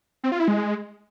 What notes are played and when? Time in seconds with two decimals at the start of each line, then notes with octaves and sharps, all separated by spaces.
0.24 C4
0.32 F4
0.40 E4
0.48 G#3